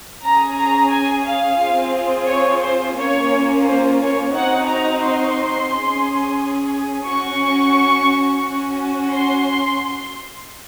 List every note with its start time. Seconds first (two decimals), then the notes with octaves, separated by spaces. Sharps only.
0.23 C#4 G#4 A#5
0.58 A#5
0.92 G#5
1.27 F5
1.60 C4 F4 G#4
2.29 C#5
2.63 C5
2.97 A#3 C#4 F4 C#5
3.65 C5
4.00 C#5
4.34 C4 D#4 F#4 F#5
4.68 A#5
5.02 C6
5.71 C#4 G#4
7.07 C#4 F#4 C#6
8.44 C#4 F#4
9.13 C6